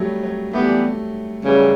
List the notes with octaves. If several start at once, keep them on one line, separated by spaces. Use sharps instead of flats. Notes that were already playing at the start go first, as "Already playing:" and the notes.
Already playing: F#3 G3 A3
F#3
E3 A3 B3 D4 G4
F#2 C#3 E3 G3